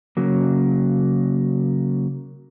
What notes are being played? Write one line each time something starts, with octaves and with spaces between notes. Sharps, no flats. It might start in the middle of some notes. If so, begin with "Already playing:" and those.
C#3 F#3 A#3